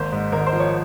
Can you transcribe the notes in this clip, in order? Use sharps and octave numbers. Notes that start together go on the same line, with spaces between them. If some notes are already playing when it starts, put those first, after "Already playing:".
Already playing: G#1 A#3 C5
G#2
G#1 A#4
C5
F3
C#5